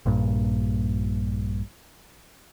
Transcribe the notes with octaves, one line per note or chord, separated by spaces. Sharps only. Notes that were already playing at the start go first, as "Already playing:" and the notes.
A#1 G2 A#2